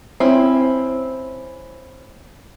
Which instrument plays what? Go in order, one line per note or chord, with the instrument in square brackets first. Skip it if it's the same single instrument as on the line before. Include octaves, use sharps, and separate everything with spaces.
[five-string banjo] C4 C#4 E4